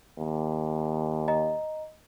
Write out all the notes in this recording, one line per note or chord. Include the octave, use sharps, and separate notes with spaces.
D#2
D#5 A#5